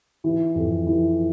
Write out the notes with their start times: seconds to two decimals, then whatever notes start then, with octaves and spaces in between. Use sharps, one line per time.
0.24 E3
0.55 F2
0.87 E3